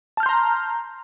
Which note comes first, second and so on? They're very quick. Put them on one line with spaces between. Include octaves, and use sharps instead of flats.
A5 F6 G6 C6 A#5